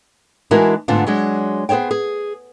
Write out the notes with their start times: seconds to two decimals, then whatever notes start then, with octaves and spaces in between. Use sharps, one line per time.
0.51 E3 G#3 D4 E4 F#4 A#4
0.88 G#2 D3 A3 B3 D4 F4
1.06 F#3 G#3 D4
1.69 B3 G#4 C5 C#5 G5
1.91 G#4